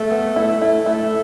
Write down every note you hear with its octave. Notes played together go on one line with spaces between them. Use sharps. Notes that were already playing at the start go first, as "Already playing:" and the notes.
Already playing: A3
B3
A3 E4
E4
A3 E4